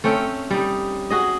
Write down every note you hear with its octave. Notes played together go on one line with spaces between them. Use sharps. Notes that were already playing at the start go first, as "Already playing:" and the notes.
A3 C4 C#4 G5
G3 D#4
F#4 G#4 D#5